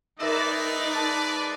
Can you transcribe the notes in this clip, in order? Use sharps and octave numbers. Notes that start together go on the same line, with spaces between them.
G#3 D#4 A#4 B4 D5 E5 E6
A5